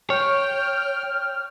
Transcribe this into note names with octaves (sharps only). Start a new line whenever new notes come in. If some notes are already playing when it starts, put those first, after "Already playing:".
C#5 G5 F6